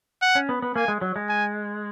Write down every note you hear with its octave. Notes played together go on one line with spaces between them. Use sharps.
F#5
C#4
B3
B3
A#3 G#5
G#3
F#3
G#3
G#5